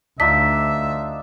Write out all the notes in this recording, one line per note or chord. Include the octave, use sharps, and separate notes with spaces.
D2 D4 D#4 F4 E5 B6